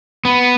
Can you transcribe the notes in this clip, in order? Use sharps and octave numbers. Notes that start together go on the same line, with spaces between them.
B3